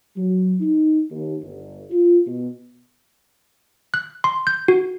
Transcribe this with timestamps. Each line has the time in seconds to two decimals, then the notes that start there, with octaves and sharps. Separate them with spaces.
0.17 F#3
0.61 D#4
1.11 D#2
1.42 G1
1.90 F4
2.27 B2
3.94 F#6
4.24 C6
4.47 G6
4.68 F#4